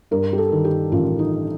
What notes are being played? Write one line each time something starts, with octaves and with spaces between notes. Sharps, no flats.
G2 A#4
G4
A4
D#3
G4
A1 F4
D#4